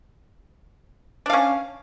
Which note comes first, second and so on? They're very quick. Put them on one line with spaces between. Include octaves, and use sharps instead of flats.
D4 F5 C#4